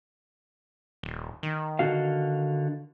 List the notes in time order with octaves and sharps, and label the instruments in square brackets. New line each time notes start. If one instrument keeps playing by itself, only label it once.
[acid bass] D#1
D#3
[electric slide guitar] D3 F#4 F5